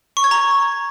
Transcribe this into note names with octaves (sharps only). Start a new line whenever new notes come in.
C#6
G#6
A#5